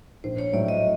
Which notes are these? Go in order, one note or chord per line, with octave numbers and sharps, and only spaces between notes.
A#1 C5
C#5
A2 F#3 D5
D#5